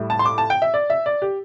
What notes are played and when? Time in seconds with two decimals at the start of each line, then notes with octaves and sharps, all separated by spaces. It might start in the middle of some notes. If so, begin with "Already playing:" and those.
Already playing: A2 G3 E4
0.10 A5
0.19 C6
0.25 D6
0.38 A5
0.50 G5
0.62 E5
0.74 D5
0.90 E5
1.06 D5
1.22 G4